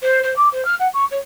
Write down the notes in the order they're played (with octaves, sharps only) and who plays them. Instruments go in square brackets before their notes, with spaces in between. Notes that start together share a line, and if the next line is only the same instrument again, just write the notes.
[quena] C5
C5
D6
C5
F6
F#5
C#6
C#5